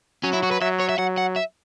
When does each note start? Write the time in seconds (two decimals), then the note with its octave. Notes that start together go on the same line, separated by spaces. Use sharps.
0.23 F#3 C#4
0.33 E4
0.43 F#4
0.51 B4
0.61 F#3 E5
0.80 C#5
0.89 E5
0.98 F#3 F#5
1.18 F#5
1.36 E5